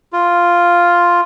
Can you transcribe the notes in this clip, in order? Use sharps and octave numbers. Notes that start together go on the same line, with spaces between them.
F4